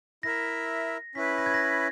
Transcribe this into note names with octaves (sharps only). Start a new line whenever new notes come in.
E4 A#4 E5 A#6
C#4 E4 B4 B6
A#6
G#6
A#6